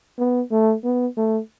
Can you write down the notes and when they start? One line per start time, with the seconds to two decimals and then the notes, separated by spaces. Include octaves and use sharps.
0.19 B3
0.51 A3
0.84 B3
1.17 A3